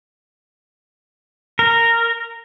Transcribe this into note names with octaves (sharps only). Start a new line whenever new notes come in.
A#4